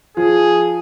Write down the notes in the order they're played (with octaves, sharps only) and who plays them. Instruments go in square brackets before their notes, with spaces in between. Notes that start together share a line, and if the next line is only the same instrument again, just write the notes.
[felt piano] F3 [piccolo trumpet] G#4